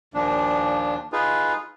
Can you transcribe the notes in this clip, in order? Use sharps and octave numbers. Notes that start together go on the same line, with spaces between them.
D#2 A#2 F3 D4
D#4 F4 G#4 B4